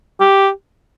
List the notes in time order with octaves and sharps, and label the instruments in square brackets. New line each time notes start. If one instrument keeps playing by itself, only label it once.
[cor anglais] G4